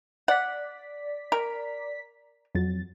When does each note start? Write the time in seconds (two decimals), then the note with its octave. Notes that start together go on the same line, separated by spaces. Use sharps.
0.28 D5 F#5 B6
1.32 A#4
2.55 F2 F#3 A6